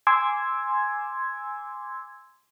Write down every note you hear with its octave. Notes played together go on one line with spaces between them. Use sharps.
G#5 C6 D6 E6 G#6